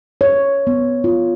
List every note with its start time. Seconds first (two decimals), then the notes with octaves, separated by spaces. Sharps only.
0.21 C#5
0.67 B3
1.04 F4